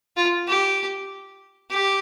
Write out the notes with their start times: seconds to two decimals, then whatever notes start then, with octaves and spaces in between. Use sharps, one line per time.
0.17 F4
0.47 G4
1.70 G4